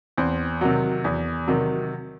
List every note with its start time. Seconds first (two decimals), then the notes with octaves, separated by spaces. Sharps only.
0.18 E2 C4
0.61 C3 D#3 F#3
1.04 E2
1.48 C3 D#3 F#3